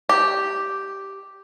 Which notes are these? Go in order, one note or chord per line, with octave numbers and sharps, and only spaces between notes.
G4